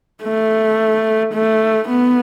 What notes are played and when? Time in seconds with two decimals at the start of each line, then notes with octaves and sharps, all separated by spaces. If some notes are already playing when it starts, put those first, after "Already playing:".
0.23 A3
1.34 A3
1.89 B3